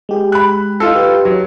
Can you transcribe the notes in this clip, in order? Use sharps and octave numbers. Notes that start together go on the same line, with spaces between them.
G#3 G4 G#4
B5 F#6
D#4 F4 A4
G4 B4
F#3